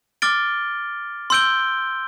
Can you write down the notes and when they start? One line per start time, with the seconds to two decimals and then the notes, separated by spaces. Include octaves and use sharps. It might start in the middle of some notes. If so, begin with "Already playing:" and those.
0.22 D6 F6 A6 D7 G7
1.30 C6 E6 G6 D7 G7